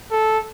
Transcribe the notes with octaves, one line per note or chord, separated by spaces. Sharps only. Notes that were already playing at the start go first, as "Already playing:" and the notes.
A4